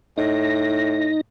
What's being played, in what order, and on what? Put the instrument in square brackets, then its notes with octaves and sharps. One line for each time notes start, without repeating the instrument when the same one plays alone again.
[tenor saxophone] A2 [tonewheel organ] D#4 A#6